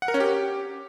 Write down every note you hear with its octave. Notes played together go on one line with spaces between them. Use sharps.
F#5
A#4
C#4
G4